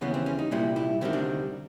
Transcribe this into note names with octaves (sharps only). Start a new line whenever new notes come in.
D#2 C#3 E3 G3 B3
C4
C#4
D#4
C2 A#2 G3 E4
E4
D2 C3 D#3 G3 E4
D4